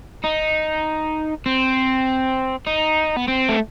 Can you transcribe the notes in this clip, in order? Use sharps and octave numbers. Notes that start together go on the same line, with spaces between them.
D#4
C4
D#4
B3
C4
A3